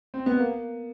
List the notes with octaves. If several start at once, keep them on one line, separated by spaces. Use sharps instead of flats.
C4
B3
A#3